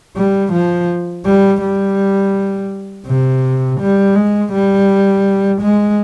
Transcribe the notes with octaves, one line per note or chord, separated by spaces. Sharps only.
G3
F3
G3
G3
C3
G3
G#3
G3
G#3